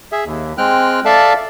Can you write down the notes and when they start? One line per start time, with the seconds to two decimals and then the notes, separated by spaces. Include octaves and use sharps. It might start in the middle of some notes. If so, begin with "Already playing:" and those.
0.12 G#4 E5
0.25 D#2
0.58 G#3 C4 G5 F6 F#6
1.05 A4 D5 E5 F5 A5